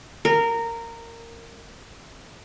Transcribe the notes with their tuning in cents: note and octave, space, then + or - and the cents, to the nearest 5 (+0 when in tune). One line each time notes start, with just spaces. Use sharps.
A#4 -15